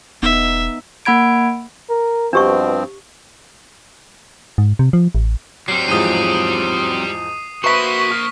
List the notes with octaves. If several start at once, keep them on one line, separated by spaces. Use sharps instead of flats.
E1 B3 D#4 E5
A#3 F#5 B5 G#6 D7
A#4
G2 B2 F3 C4 D4 G4 C#6
G#2
C3
F3
A1
F#3 G3 C4 C7
E2 G#2 F3 D#6 C7 D#7
A#3 F#4 B4 C5 E5 B5 C#6 B6
F6